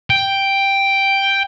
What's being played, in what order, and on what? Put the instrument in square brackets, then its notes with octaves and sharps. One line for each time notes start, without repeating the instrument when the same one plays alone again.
[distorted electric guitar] G5